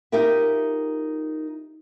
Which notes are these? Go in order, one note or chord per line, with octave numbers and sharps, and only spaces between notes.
D#4 F4 G4 A#4 E5